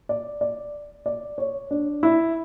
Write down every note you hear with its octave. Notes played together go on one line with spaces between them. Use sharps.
D5
D5
D5
C#5
D4
E4